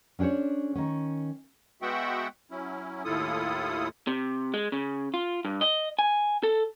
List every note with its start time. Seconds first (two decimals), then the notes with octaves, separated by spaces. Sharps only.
0.19 C#4 D4 G#4 C5 C#5
0.75 D#3 C#4
1.82 G#3 B3 F#4 E5 F#5 G5
2.51 F#3 C#4 E4
3.04 D#2 A2 E4 F4 A4 D#6
4.07 C3
4.54 G#3
4.72 C#3
5.14 F4
5.45 G2
5.61 D#5
5.99 G#5
6.43 A4